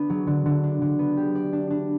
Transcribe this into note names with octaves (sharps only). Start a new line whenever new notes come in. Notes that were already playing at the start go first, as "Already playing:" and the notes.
Already playing: D3 B3 D4
F#3
D3
D3
D4
D3
B3
G4
D5
D4
D4